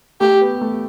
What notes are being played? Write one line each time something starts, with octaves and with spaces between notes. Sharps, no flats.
A3 G4
B3
A3